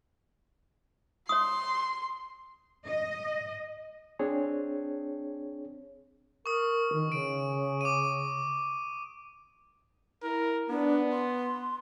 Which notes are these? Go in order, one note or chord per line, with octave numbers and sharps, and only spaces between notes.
C#5 C6 D#6
D#5
C4 D4 G#4 C#5
A#4 C#6 D#6
D#3
C#3 D7
D6 D#7
E4 A#4
B3 D4
C6